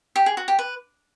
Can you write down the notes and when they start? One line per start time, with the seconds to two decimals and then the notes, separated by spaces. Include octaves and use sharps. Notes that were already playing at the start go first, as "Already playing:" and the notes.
0.16 G4
0.26 G#4
0.37 F#4
0.48 G4
0.59 B4